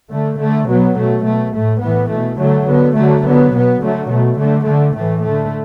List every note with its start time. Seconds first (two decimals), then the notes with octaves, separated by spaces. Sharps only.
0.11 D3 A3
0.40 D3 A3
0.68 B2 F#3 B3
0.96 B2 A3
1.25 B2 A3
1.53 A2 A3
1.81 A2 E3 B3
2.10 B2 A3
2.39 D3 F#3 A3
2.67 D3 B3
2.96 D3 F#3 A3
3.24 D3 F#3 B3
3.53 B2 B3
3.81 D3 F#3 A3
4.10 B2 A3
4.38 D3 A3
4.66 D3 A3
4.95 A2 E3 A3
5.24 D3 A3